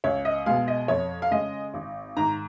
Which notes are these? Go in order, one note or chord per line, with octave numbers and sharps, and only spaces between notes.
C#2 C#5
D#5
B2 G#3 F5
D#5
F2 C#5
F5
C#3 G#3 D#5
G#1
G#2 D#3 A#5